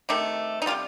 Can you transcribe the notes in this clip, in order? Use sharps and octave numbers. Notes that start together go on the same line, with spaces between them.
C3 D#3 A3
D#4
C3 D#3 G3 F4